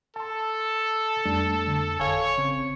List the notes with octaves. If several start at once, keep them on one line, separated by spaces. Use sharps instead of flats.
A4 A5 C6
F2 G3 A3 D4
D3
G1 A4 C#5 F5 G#5
C#3 C4